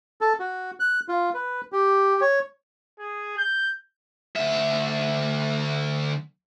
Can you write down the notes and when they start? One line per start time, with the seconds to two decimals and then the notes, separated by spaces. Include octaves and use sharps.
0.21 A4
0.40 F#4
0.80 F#6
1.08 F4
1.34 B4
1.72 G4
2.21 C#5
3.00 G#4
3.38 G6
4.36 D2 E5